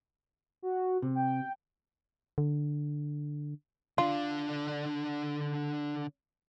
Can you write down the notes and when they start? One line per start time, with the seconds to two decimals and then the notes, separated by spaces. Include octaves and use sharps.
0.62 F#4
1.02 C3
1.15 G5
2.38 D3
3.98 D3 D4 F4